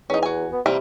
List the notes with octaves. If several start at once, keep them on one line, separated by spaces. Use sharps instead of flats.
E2 C#4 D#4
F#4 G#5
B3
C3 E3 G3 A#3